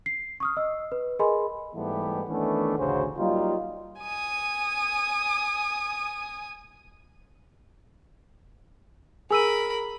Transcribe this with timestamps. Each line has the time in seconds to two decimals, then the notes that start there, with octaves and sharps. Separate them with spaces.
0.06 C7
0.40 C#6 D#6 F6
0.57 D#5 E6
0.92 B4
1.19 G#4 A#4 D#5 G#5 B5 C6
1.75 G#2 E3 G3 A3 B3 G4
2.29 D#3 E3 A3 B3 C#4 D4
2.78 A1 D2 C#3 C#4 F#4 C5
3.18 F#3 G3 A#3 D#4 F4
4.01 G#5 D#6
9.31 G#4 A#4 G#5 B5 E6 D#7